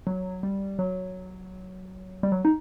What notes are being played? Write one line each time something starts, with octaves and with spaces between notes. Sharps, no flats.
F#3
G3
F#3
G3
F#3
D#4